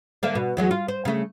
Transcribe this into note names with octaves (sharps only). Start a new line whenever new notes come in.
D3 A#3 E5
B2
E2 F#3 G#3
F4
C5
C#3 A3